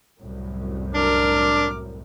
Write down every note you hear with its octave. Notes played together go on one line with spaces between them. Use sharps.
C2 F#2 A2
D4 A#4 D6 F6